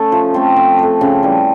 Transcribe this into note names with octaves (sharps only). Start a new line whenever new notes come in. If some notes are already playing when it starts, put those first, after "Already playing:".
Already playing: A3 C#4 A4
F3
A3 C4
F3
A3 C4
C#3
E3 G3